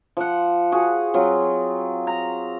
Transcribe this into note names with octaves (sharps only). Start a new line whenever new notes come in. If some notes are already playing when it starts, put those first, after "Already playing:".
F3 F#5
F#4 G#4
F#3 C4 F4
A#5